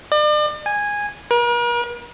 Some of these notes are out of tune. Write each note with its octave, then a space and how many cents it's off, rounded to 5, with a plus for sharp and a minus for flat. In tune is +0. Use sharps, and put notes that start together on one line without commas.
D5 +40
G#5 -10
A#4 +45